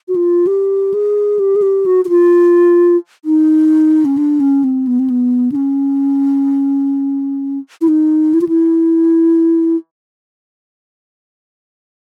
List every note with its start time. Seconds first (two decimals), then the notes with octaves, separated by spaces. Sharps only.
0.08 F#4
0.16 F4
0.47 G4
0.94 G#4
1.39 G4
1.56 G#4
1.62 G4
1.86 F#4
2.05 F#4
2.09 F4
3.25 D#4
4.05 C#4
4.17 D4
4.40 C#4
4.64 C4
4.87 B3
4.99 C4
5.10 B3
5.52 D4
5.56 C#4
7.81 E4
7.88 D#4
8.34 E4
8.41 F4
8.48 E4